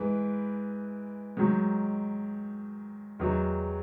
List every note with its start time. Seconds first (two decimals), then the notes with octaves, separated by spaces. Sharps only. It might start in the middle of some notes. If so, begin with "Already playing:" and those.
Already playing: G#2 E3 B4
1.37 G#2 D#3 F#3
3.19 E2 D#3 F#3